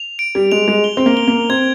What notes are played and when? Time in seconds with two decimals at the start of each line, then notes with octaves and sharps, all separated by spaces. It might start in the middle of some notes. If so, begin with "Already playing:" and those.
Already playing: F7
0.19 D7
0.35 G3
0.51 G#3 F7
0.68 G#3
0.84 G7
0.97 C4
1.06 A#3
1.17 G7
1.27 A#3
1.50 C4 G#6